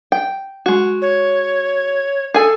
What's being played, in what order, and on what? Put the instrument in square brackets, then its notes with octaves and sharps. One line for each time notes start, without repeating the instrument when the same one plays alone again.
[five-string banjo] G5
G#3 F#4
[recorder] C#5
[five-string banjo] G#4 G#5 [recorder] A4